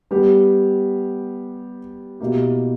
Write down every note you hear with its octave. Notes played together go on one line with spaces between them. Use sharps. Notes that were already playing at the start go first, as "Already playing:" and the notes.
G3 B3 G4
B2 A#3 E4 G4